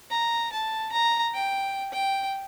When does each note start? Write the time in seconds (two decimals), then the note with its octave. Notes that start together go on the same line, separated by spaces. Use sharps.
0.10 A#5
0.52 A5
0.92 A#5
1.34 G5
1.92 G5